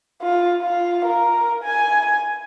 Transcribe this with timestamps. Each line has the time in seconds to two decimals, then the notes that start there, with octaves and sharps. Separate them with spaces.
0.22 F4
0.62 F4
1.05 A#4
1.64 G#5